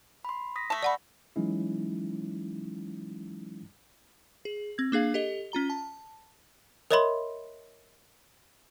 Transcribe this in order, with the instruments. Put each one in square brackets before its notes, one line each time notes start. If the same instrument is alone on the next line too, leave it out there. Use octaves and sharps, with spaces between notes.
[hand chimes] B5 C6
D#6 A#6 B6
[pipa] A3 A5
[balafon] D5 F#5 B5
[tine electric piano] E3 F#3 G#3 C#4 D#4 E4
[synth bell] G#4
C4 G#6
A#3 D4 G#4 F5
G4 A4 D#5
C#4 F4 A#5 G7
A5
[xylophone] A#4 C#5 D#5 E5 B5 C6